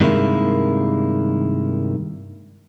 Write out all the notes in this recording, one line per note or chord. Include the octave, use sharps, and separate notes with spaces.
G2 C3 D#3 G#3 A#3 E4